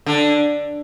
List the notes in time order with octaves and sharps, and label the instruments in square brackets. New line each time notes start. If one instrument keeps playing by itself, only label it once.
[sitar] D3